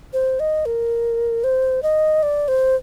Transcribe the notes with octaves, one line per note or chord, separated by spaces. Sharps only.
C5
D#5
A#4
C5
D#5
D5
C5